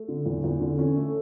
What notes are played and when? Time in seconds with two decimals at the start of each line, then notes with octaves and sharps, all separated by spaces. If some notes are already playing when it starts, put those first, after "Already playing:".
Already playing: A3
0.08 D3
0.26 E2
0.44 E2
0.60 D3
0.78 C#4
0.96 A3